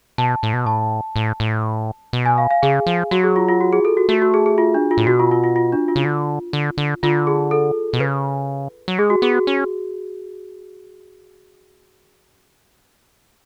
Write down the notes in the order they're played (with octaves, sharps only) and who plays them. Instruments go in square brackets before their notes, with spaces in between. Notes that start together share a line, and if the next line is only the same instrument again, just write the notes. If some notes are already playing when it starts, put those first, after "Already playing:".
[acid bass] B2 [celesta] A5
[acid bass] A2
B2
[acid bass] A2 [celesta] A5
[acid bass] A2
A2
B2
[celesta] G#5
F5
F5
[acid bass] C#3 [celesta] G#4
[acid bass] F3
[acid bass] F#3 [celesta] F#4
[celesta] G#4
F4
F4
F#4
G#4
A4
F#4
[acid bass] A3 [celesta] F#4
[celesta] F#4
G#4
G#4
F4
D4
F4
[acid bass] A2
[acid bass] B2 [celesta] F#4
[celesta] F4
F4
F4
F4
D4
F4
[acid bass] C#3
D3
D3
D3
[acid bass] D3 [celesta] F4
[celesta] G#4
A4
[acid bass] B2
[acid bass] C#3 [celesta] B4
[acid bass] F#3
[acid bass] G#3 [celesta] G#4
[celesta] F#4
[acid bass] B3 [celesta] G#4
[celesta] F#4
[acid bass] C#4